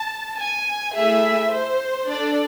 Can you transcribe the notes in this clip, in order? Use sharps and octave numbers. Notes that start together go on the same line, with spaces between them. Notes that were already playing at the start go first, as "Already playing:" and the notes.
Already playing: A5
G#5
A3 E4 G#4 E5
C5
D4 A4 D5